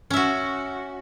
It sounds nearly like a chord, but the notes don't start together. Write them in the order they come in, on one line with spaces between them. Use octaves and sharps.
C#4 E5 F#4